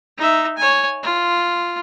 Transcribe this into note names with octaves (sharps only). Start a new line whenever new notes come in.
D#4 E5
C#5 G#5
F4